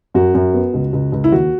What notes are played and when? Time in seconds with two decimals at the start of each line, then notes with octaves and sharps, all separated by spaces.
0.14 F#2 F#4
0.34 F#2
0.54 B3
0.74 C#2
0.93 C#2
1.12 C#2
1.24 E4
1.32 D#2 F#4